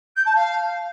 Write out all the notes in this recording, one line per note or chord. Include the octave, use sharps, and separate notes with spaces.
G6
A5
F5